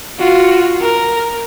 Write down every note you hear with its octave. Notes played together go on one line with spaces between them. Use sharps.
F4 F#4
A#4